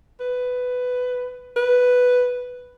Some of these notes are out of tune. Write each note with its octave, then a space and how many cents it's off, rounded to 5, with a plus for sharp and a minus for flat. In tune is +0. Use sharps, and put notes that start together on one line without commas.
B4 +15
B4 +5